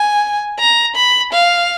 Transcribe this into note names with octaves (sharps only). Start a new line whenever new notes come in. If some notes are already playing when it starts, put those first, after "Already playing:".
Already playing: G#5
A#5
B5
F5